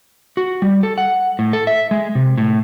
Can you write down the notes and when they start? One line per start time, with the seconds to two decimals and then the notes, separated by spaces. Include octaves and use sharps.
0.37 F#4
0.62 G3
0.83 A4
0.98 F#5
1.39 A2
1.53 A4
1.67 E5
1.91 G#3
2.15 C3
2.38 A2